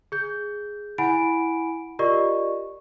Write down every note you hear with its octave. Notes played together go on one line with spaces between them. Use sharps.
G#4 G6
E4 F#5 G#5 B5 D7
F4 G4 A#4 D5 D#5 C#6